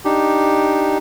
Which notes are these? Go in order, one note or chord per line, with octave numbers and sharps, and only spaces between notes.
D4 D#4 G4